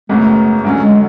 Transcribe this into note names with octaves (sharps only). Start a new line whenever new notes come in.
G#1 F#2 C#3 F#3 A3 B3
D2 D3 F#3 C#4
G#3